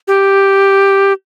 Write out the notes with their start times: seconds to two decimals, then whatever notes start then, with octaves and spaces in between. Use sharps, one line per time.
0.08 G4